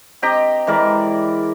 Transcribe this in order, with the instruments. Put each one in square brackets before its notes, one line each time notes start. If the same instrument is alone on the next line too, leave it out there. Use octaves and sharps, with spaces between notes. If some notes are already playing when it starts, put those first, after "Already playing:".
[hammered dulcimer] C4 G4 D#5 A#5
E3 G#3 A#4 D5